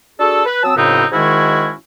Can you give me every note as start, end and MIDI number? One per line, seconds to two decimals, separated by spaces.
0.19 0.42 62
0.19 0.42 66
0.19 0.42 68
0.19 0.42 69
0.46 0.61 71
0.63 0.75 54
0.63 0.75 60
0.63 0.75 81
0.63 0.75 87
0.63 0.75 88
0.76 1.04 42
0.76 1.04 45
0.76 1.04 49
0.76 1.04 59
0.76 1.04 60
0.76 1.04 63
1.12 1.72 44
1.12 1.72 51
1.12 1.72 56
1.12 1.72 61
1.12 1.72 64
1.12 1.72 66